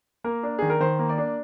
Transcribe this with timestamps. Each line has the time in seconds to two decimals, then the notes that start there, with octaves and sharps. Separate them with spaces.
0.24 A#3 A#4
0.43 D4
0.59 D#3 G#4
0.70 A#4
0.80 D#3 C5
0.99 A#3
1.09 D5
1.18 D4